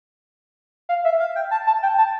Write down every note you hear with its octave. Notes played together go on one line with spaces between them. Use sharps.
F5
E5
F5
G5
A5
A5
G5
A5